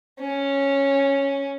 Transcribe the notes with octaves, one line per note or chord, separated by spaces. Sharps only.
C#4